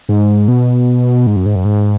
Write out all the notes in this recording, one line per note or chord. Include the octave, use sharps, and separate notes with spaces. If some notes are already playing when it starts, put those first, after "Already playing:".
G#2
B2
G#2
F#2
G#2
F#2
G#2